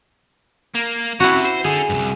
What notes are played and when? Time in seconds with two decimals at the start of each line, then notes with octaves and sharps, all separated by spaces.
0.75 A#3
1.20 C3 E4 F#4
1.45 C5
1.64 D3 G#4
1.89 C2 G2